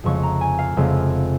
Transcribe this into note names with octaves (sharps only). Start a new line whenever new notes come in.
F1 F2 C#3 G#3 C#6
A#5
G#5
F5
F1 F2 C#3 G#3